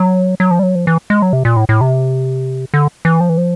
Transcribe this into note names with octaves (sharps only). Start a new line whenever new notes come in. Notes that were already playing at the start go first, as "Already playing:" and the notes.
Already playing: F#3
F#3
F3
G3
F#3
F3
E3
G#3
F#3
C3
A#2
A2
A2
C3
D3
E3
F3
E3
F3